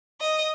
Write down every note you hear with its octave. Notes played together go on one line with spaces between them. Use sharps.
D#5